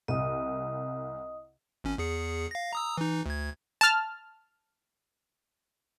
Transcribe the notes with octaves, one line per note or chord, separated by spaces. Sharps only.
C2 D#5 D#6
G#1 C#4
E2 G#4 C#7
F5 A#6
A#5 D#6 E6
E3 D#4
D2 G#6
A5 F6